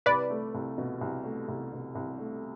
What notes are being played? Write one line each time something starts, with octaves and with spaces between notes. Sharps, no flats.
C2 B4 D5
A3
C2
B2
C2
A3
C2
B2
C2
A3